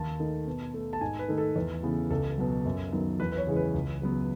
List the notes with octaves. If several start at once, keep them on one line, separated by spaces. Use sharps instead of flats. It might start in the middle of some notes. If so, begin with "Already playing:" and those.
Already playing: D#2 A5
D#3 A3
B2
A3
A5
G#2 G#5
B4
D#3 A3
A4
E2
C#3 E3 B3
C#2 A4
B2 F#3
F#2
D#3 F#3 B3
E2 B4
B4
C#5
C#3 E3 G#3
B4
C#2
C#3 F#3 B3